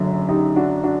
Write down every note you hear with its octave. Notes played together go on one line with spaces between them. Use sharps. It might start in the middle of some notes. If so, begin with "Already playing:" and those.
Already playing: F#1 F#2 D3 F#3 A3
D#4 G4
D4 F#4
D4 F#4